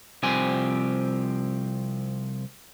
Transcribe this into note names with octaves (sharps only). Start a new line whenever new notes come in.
C2 F3 C4 G4 G#5